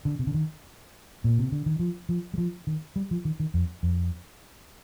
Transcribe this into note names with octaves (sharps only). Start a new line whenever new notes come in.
D3
C3
D3
D#3
A#2
C3
D3
D#3
F3
F3
G3
F3
D#3
G3
F3
D#3
D#3
F2
F2